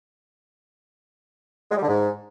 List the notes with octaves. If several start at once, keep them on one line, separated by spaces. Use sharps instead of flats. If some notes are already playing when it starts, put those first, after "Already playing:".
G#3
G3
D3
G#2